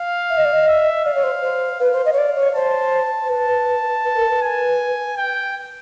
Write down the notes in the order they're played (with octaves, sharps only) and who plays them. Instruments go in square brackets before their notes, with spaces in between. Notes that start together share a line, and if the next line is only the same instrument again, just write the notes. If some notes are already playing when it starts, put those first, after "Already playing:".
Already playing: [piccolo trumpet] F5
[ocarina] E5
D#5
D5
D#5
[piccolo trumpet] E5
[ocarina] D5 [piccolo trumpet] F5
[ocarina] C#5
C5
C5
[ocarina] B4 [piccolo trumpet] F5
[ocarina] C5
D#5
C#5
D5
C#5
[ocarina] C5 [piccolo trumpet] A5
[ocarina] C5
[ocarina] B4 [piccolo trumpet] A5
[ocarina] B4
A#4
B4
[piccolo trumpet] G#5
G5